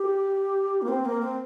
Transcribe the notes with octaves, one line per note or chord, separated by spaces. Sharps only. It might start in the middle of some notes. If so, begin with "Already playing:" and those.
Already playing: G4
A#3
C4
A#3
C4